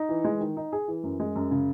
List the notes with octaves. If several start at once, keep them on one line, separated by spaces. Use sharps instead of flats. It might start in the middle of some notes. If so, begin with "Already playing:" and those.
Already playing: D#4
E3
G#3
D#3
D#4
G#4
E3
F#2
G#3
F#2
C#3